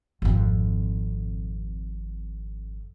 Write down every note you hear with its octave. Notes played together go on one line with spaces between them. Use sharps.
G#1 F2